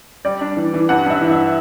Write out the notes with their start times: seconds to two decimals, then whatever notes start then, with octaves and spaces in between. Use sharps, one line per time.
0.25 G3 D5
0.41 D4
0.57 E3
0.74 E3
0.89 G2 F#5
1.06 G2 E5
1.21 E3
1.32 E5